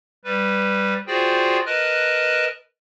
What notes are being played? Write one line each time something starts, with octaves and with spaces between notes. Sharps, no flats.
G3 B4
F4 F#4 G#4 C5 D5 G5
A#4 B4 D#5 A5 F6 F#6